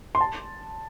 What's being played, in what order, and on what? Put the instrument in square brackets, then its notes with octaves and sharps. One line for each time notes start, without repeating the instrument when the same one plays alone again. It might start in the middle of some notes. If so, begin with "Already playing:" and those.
[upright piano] C6
A5